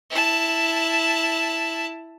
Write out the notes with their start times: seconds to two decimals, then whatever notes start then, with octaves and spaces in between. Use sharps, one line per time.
0.10 E4 A5